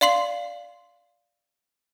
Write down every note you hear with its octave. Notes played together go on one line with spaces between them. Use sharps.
D5 F5 C6 C7 F#7